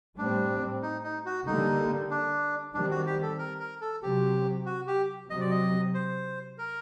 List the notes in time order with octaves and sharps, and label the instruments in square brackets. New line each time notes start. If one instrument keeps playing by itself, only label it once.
[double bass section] A2 G3 C4 [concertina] D4
[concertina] D#4
D#4
F#4
[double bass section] D3 G3 A#3 [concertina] D#4
[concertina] D4
[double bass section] D#3 G3 C4 [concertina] D4
[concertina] F#4
G4
A4
A#4
A#4
A4
[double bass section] C3 F#3 C4 [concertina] G4
[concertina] F#4
G4
[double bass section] C3 F#3 C4 [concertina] D#5
[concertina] D5
D#5
C5
A#4